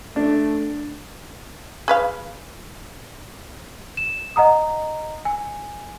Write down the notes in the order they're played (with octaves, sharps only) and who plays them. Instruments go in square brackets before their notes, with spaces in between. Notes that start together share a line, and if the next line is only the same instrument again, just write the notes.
[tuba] A3 [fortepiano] D4
[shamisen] G#4 B4 F5
[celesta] E7
D#5 F#5 A#5 D#6
G#5